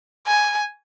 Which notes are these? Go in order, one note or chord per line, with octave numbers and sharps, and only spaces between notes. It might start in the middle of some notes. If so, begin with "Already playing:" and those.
G#5